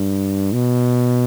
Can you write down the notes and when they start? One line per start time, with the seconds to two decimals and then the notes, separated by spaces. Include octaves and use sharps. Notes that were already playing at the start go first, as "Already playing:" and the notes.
Already playing: G2
0.53 B2